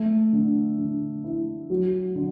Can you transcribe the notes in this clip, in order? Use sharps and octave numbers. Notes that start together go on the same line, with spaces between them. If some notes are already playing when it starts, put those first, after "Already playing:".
Already playing: A3
D3
D3
E4
F#3
D3